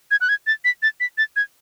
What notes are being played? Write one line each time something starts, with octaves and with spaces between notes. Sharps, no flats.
G#6
F#6
G#6
A6
B6
A6
B6
A6
G#6